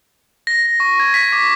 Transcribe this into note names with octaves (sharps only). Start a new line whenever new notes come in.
A#6
C#6
G#6
B6
D6